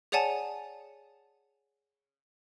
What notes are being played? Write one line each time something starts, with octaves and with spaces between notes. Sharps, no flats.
G#4 C#5 D5 F#5 G#5 A5